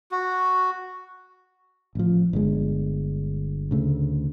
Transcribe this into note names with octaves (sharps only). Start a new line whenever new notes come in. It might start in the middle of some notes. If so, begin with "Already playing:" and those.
F#4
A1 F3
G1 G#3
D2 C#3 A3